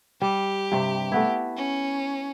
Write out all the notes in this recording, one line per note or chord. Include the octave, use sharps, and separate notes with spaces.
G3 G4
G2 C3
A3 B3 E4
C#4